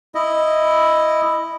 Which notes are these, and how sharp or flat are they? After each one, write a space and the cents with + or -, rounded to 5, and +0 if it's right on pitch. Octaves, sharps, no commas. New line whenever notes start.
E4 +0 D#5 +0